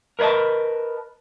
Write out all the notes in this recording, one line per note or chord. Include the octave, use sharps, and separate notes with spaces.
A#4 B4 C#5 D#5 A5